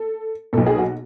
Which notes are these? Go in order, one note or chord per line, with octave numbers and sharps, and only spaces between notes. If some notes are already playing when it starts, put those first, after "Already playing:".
Already playing: A4
B1 B2 A4
G#4
F#4